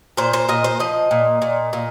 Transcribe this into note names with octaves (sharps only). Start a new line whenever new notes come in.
A#2 C5
C5
A#2 D#5
C5
F3 D#5
A#2
A#2
A#2